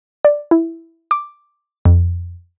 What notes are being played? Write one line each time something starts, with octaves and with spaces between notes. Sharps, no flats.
D5
E4
D6
F2